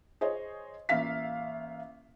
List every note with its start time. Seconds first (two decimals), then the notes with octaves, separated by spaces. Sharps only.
0.21 G#4 C5 C#5 D#5
0.89 A1 A#3 E5 F5 B6